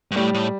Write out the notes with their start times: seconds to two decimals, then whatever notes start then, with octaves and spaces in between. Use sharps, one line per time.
0.11 G2
0.16 A2 G3
0.34 A2